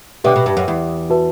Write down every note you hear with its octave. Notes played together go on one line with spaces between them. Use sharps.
B2 D3 G4 B4 E5 G5 D6
B2
G2
F#2
E2
F#4 B4 E5 A5